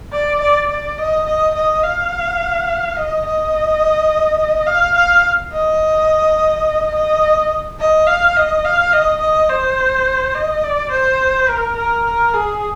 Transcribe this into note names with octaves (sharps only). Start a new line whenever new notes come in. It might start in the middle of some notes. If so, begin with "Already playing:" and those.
D5
D5
D5
D#5
D#5
D#5
F5
D#5
D#5
F5
F5
D#5
D#5
D#5
F5
D#5
F5
D#5
D#5
C5
D#5
D5
C5
A#4
A#4
A#4
G#4